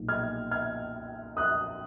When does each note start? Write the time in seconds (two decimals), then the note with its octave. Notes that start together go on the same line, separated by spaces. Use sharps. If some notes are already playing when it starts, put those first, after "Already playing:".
Already playing: B1 A#2 F#3 B3
0.08 F6 G#6
0.51 F6 G#6
1.37 D#6 F#6